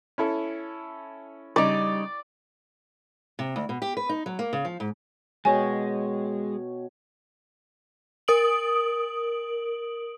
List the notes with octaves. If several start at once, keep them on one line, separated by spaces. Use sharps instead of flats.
C#4 E4 A4
C#3 G3 D#4 D5
C3
D2
B2
G4
B4
D#4
F#3
A#3
C#3
F3
G#2
B2 G#3 C#5 G5 G#5
A#4 D#6 D7 F#7